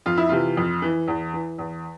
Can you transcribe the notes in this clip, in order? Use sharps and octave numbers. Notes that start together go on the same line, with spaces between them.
F2 F4
E4
C3 E3 F4
F2
E3
E2
E3
E2